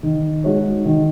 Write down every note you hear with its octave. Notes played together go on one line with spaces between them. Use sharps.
D#3
G#3 D#4 F#4 C#5
D#3